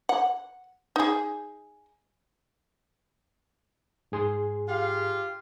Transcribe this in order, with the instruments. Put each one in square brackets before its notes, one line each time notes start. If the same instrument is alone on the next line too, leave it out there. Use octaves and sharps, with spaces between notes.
[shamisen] F#5
D#4 G#4
[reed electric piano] G#2 G#4 C6
[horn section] F4 G4 F5